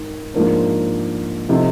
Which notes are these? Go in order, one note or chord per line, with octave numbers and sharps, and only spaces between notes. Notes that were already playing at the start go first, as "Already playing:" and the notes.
Already playing: G#2 D#3
G#2 F3 A#3 D4
C3 F3 A3 C4 D#4